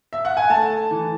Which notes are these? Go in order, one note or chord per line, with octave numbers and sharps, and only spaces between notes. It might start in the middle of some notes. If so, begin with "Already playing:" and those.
E5
F#5
G#5
A3 A5
E3